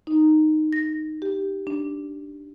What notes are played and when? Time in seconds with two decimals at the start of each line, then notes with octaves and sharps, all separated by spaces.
0.07 D#4
0.73 A#6
1.22 G4
1.67 D4